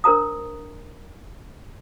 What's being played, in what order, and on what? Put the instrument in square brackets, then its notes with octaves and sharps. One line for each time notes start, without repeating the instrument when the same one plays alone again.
[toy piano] D4 A#4 C5 A#5 D#6